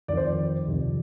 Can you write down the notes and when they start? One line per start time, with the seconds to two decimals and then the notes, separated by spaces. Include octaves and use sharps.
0.08 F2 D#3 D5
0.17 C5
0.26 D5
0.67 F2 C3 D#3